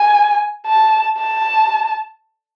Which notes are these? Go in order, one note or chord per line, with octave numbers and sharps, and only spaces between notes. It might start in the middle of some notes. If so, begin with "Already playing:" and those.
Already playing: G#5
A5
A5